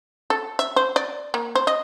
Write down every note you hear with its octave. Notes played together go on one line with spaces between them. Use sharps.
A4
E5
C5
D5
A#3
C5
D#5